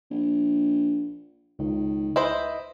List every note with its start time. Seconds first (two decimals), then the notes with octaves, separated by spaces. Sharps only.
0.11 A#1
1.59 C#2 D#3
2.16 E4 B4 C5 D#5